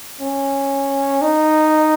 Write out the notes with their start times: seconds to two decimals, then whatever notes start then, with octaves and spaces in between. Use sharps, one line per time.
0.21 C#4
1.22 D#4